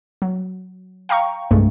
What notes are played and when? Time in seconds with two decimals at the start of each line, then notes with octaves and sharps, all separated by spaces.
0.22 F#3
1.09 F5 G5 A#5 C#6
1.51 C2 G2 G#3 A3